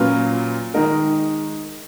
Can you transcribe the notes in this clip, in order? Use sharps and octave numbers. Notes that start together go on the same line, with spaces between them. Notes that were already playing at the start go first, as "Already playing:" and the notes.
Already playing: A#2 F#3 C#4 F4 B4
D#3 G#3 D#4 A#4